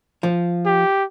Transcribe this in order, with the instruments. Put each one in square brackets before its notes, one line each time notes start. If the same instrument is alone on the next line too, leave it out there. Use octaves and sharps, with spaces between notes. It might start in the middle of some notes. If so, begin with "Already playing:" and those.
[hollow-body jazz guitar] F3
[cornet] G4